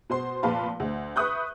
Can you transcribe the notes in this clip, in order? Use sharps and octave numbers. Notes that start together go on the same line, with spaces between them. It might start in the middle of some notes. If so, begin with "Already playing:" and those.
B2 C5 C6
F1 A#2 B4 F5 A5 B5
D2
B4 E5 C#6 D#6 F#6 G6